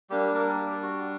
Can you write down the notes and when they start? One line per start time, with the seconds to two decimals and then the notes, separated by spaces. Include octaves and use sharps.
0.10 G3 A#3 D4 G4
0.34 A#3 A#4
0.58 G4
0.83 F#4